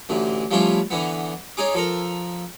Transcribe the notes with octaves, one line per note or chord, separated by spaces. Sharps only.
A1 D2 E3
F3 G3 A3 C#4 E4 F4
D3 E3 B3
C#4 D#4 G#4 G#5 D6
F3 A4 A#4